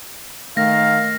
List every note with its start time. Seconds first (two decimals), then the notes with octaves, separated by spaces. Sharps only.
0.57 D#3 A3 F5 A#6